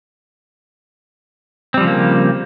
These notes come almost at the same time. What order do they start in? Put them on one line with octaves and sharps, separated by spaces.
C4 G3 F3 C#3 A#3